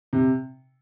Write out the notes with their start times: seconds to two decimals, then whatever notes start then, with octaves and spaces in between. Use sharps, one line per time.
0.13 C3